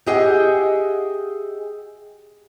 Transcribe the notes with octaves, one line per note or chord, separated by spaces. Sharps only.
G4 G#4 D#5 E5 F#5 G5